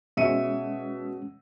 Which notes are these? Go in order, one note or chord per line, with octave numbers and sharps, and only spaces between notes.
B2 G#3 C#4 E5 C#7 D#7